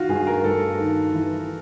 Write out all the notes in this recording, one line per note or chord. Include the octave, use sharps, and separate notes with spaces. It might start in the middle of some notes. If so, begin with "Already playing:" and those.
Already playing: D#3 F4 F#4
G2 G#4
A#4
G2 A4
D#3
E3